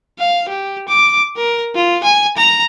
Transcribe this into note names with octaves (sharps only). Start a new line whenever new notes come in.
F5
G4
D6
A#4
F4
G#5
A#5